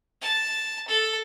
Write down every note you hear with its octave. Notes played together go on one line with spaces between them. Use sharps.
A5
A4